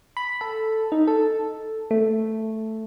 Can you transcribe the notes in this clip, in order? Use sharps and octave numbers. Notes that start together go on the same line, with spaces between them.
B5
A4
D#4
A4
A3